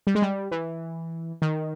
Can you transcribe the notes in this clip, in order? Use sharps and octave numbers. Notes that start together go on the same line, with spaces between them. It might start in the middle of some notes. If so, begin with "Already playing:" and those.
G3
G#3
G3
E3
D#3